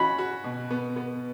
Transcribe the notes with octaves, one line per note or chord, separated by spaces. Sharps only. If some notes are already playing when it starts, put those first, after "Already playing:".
Already playing: C#4 F#4 B5
F#4
B2
B3
B3